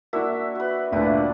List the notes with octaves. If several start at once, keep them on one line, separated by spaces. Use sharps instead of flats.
A#3 D4 E4 F#4 E5
F#4 B4
D2 A#2 D4 E4 F#4 B4